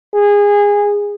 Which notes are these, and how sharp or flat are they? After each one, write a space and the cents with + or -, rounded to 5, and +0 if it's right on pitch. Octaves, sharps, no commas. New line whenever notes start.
G#4 -25